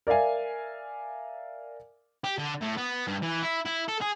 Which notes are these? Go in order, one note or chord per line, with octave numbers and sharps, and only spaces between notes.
A#4 D5 E5 F5 G#5
G4
D3
A2
B3
G2
E3
E4
E4
A4
G#4